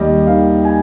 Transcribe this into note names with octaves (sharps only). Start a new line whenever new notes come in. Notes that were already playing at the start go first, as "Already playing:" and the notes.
Already playing: D#2 G3 D#5
D#3 F5
G#5